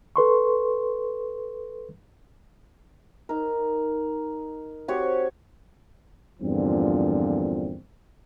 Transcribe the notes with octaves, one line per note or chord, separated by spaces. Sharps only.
A4 B4 C6 C#6
D#4 A#4
C4 F#4 G4 C#5
E2 G2 A#2 D3 F3 C4